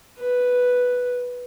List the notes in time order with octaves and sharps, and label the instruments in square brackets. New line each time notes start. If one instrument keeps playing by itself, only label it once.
[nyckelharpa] B4